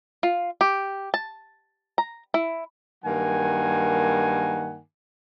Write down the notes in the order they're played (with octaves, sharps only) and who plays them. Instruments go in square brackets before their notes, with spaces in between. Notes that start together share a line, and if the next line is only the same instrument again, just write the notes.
[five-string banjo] F4
G4
A5
A#5
E4
[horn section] G2 D#3 F#3 A#3 F#5 G#5